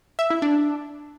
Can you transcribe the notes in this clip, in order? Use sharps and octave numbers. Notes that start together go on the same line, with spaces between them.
E5
E4
D4